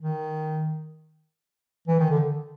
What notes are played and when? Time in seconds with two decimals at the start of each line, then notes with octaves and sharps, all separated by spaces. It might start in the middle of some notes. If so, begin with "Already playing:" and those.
0.01 D#3
1.87 E3
1.99 D#3
2.10 D3